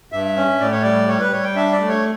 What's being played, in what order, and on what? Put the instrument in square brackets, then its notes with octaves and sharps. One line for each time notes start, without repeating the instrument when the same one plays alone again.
[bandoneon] G2 E5
C#4
A2 D5
C#5
G3 D5
G3 C#5
B4
G3 C#5
G5
D4 E5
D5
A3
C#5